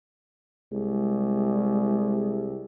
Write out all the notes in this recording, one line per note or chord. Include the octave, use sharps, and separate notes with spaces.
C2 G#3